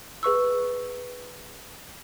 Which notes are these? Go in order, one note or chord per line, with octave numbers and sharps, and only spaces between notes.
G#4 B4 C#6 E6